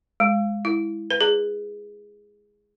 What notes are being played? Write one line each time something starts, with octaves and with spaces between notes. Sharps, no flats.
G#3
E4
B4
G#4